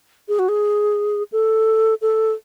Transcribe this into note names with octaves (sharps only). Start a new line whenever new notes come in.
G#4
F#4
G#4
A4
A4